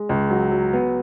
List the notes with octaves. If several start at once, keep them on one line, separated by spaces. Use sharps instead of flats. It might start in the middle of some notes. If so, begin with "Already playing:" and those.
Already playing: G#3
C#2
F#3
F#3
B3